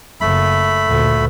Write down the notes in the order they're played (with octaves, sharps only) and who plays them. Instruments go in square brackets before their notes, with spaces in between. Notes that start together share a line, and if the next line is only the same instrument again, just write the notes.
[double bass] F#1 [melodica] A3 B5
[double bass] D2 A#2